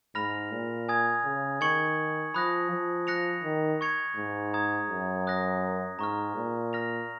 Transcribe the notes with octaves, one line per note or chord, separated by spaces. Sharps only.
G#2 B5 F6 A#6 F7
A#2
G#5 D#6 G#6
C#3
D#3 C#6 G#6 C#7 F#7
F3 B5 D#6 F#6 A#6
F3
F#6 A#6 C#7 F7
D#3
C#6 G#6 C#7 F7
G#2
A#5 D#6 G#6
F#2
D#6 F#6 A#6
G#2 A#5 C#6 F6
A#2
F6 A#6 F7